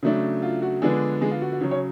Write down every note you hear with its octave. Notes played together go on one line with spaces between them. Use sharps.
C#3 F#3 A3 D4
F4
F#4
D3 F3 G#3 B3 D4 G#4
G#3 G#4
F4
F#4
F#4
C#3 F#3 C#4
C#4 C#5